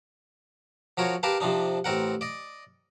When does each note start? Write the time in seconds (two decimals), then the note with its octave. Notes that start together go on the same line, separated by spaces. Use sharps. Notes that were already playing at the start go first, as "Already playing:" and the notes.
0.97 F3 F#4 A#4 C#5
1.23 G4 A#4 B4 F5 A5
1.40 C3 F3 D4 D#4
1.84 A1 C4 A#4 F#5
2.21 D5 D#5